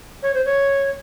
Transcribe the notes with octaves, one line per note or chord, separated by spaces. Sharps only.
C#5
C5
C#5